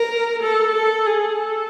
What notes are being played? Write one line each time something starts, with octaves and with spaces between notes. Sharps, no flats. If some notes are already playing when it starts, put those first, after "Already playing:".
Already playing: A#4
A4
A4
G#4
A4